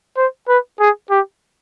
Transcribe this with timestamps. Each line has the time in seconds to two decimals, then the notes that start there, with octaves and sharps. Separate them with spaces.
0.17 C5
0.48 B4
0.80 G#4
1.11 G4